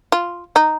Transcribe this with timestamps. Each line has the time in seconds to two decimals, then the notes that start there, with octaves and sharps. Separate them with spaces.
0.12 F4
0.56 D#4